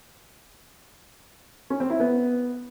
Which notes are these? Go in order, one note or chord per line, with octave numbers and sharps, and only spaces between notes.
C#4
C4
E4
B3